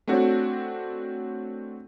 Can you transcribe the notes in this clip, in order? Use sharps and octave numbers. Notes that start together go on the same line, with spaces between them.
A3 C4 D4 F#4 C#5